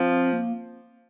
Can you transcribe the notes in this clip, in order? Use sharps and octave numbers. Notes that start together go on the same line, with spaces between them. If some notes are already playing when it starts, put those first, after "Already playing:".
Already playing: F3 C4
A#3